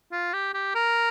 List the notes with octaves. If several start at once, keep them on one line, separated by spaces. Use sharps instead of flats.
F4
G4
G4
A#4